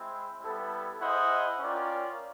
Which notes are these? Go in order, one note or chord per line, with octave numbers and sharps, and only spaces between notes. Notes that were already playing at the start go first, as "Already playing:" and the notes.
Already playing: G#3 C4 E4
G3 B3 E4 A4
E4 G#4 C5 D#5 F#5
C#4 F4 A#4 D5 G5